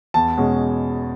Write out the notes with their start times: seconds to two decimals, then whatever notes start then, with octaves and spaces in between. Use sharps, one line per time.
0.14 E2 A5
0.37 B2 G#3 C#4